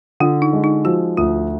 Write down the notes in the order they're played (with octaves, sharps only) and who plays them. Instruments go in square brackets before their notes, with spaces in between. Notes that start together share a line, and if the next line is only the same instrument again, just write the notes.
[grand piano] D3 [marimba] F4
[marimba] D#4
[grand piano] G#3
[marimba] D#4
[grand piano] F3 [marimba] F#4
[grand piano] D2 [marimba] F4